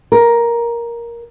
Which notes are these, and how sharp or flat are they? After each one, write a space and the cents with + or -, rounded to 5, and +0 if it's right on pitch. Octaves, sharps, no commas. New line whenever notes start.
A#4 +10